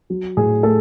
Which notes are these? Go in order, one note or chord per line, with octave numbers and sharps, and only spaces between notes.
F#3
A2 G#4
A3 A4